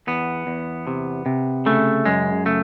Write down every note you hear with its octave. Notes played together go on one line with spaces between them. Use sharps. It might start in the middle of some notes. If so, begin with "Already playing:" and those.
E2 B3
E2
C3
C3
C#3 A3
F#2 G#3
C#3 A3